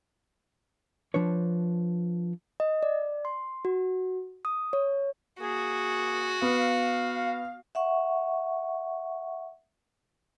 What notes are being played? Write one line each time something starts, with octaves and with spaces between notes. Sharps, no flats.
F3 D4 B4 C#5
D#5
D5
C6
F#4
D#6
C#5
A#3 F#4 G#4
B3 F5
E5 F#5 C#6